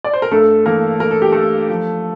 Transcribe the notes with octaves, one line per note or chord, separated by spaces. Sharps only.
D5
C5
A#4
G2 A3 A4
E3 A#3 A#4
A3 A#4
A4
G4
A3 A4
F3